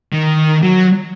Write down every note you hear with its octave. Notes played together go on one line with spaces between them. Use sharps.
D#3
F#3